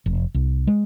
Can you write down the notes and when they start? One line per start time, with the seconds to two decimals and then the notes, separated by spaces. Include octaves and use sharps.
0.06 F1
0.34 C2
0.67 G#3